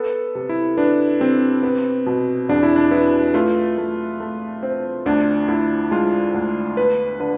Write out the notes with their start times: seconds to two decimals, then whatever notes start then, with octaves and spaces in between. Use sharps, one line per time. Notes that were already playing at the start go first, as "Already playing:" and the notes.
Already playing: B3 A4
0.35 C3
0.49 E4
0.77 B3 D4
1.20 C3 C4
1.63 B3
2.06 B2
2.49 E2 D4
2.63 E4
2.76 D4
2.91 B3 E4
3.34 A3 F4
3.78 A3
4.20 A3
4.63 C4
5.06 D2 D4
5.48 D2 E4
5.91 G#3 F4
6.34 D2
6.77 B3 B4
7.20 D3 B4